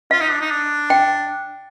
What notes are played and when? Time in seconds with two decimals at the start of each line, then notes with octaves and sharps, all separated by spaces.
0.11 F4 F5
0.21 D#4
0.31 D4
0.41 D#4
0.51 D4
0.90 G5